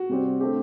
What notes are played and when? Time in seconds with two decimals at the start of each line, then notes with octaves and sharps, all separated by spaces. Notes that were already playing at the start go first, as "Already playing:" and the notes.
Already playing: F#4
0.09 C3 G3 C4
0.40 D3 A3 C4 G4